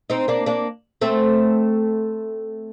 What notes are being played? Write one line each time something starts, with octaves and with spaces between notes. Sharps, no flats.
C4 D#4
A#3 D4
A#3 D4
A3 C4